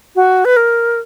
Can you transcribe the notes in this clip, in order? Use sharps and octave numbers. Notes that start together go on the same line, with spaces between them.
F#4
B4
A#4